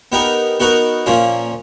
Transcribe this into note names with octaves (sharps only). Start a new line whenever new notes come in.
B3 D#4 G4 A#4
B3 D#4 F#4 A#4
A#2 F3 A#3 C#4